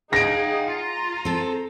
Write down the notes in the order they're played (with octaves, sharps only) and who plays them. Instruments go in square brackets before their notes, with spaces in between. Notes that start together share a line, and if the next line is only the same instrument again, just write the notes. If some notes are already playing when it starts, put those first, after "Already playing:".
[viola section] D#4 G#4 [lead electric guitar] F5 F#5 [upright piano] A#6 D7
[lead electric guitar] F4 [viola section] A#5
[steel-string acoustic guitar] C4 A4